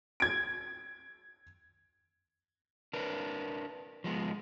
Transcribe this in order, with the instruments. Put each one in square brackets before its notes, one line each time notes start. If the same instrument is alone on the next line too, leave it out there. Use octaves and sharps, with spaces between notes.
[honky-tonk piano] G#6 D7
[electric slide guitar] D4 A#4 B4
F3 G#3 B3